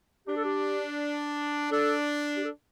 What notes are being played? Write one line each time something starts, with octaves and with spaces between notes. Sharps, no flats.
D4 G4
A4
G4
D4 A4
G4
A4